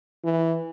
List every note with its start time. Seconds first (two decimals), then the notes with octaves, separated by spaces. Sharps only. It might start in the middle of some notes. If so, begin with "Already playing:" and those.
0.24 E3